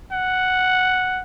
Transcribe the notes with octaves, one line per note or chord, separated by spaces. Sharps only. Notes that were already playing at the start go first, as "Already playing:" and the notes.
F#5